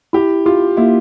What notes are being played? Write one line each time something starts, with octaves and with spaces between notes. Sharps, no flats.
E4 G4
F4 G4
A#3 E4